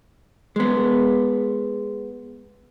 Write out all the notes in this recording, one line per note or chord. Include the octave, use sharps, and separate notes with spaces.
G#3 B3